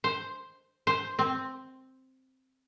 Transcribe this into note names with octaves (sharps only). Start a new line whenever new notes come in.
C5
C5
C4